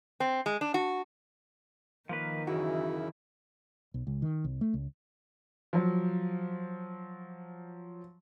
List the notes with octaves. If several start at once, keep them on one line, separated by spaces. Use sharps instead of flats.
C4
G#3
D4
F#4
D#3 F3 A#3 B4
F#2 C#3 E3 E4 F#4
B1
C#2
D#3
C2
A3
C#2
F3 F#3